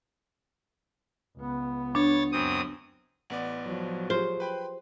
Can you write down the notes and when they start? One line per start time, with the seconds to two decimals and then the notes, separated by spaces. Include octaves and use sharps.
1.37 C#2 B3
1.95 D4 C#5 A6
2.32 F#2 C4 D#6
3.30 A1 B3 D5 F#5
3.65 F3 F#3
4.10 F4 G4 G#4 C5
4.40 B4 G5 B5